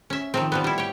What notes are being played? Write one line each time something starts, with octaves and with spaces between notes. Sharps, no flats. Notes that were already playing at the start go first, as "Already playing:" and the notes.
C#4 E5
D#3 F3 C4
F3 G3 B3
G3 E4
G4 C#5